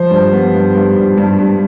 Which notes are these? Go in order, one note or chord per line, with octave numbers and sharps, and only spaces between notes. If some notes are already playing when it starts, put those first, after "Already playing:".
Already playing: F3 C5
G2
B3
G2
G2
G2
G2
G2